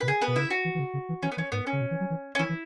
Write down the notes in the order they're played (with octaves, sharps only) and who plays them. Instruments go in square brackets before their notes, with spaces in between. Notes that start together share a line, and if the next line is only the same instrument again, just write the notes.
[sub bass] B2 [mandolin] B4
[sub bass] C#3 [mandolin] G#4
[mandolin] B3 B4
[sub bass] B2
[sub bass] C#3 [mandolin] E4 E5
[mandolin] F#4
[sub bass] E3
E3
C#3
C#3
E3
[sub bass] E3 [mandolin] C#4
[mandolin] B3
[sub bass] E3 [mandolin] C#4
[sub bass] G#2 [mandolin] B3
[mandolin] C#4
[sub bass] C#3
B2
E3
F#3
E3
[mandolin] C#4
[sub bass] E3 [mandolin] E4
[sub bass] E3